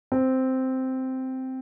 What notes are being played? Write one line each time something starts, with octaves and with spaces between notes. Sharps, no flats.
C4